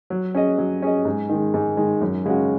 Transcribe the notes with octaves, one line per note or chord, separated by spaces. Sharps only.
F#3
C#4 G#4 D#5
F#3
C#4 G#4 D#5
G#2
D#3 G#3
G#2
D#3 G#3
F#2
C#3 G#3 C#4 F#4